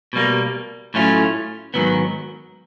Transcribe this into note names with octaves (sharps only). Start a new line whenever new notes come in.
B2 G3 A#3
A2 F#3 A3 C#4 F4
G#2 D#3 F#3 B3